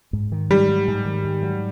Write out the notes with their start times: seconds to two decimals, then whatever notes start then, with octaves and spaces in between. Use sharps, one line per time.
0.13 G#2
0.32 D#3
0.50 G#2 G3
0.69 F#3
0.88 G#2
1.05 D#3
1.24 G#2
1.43 F#3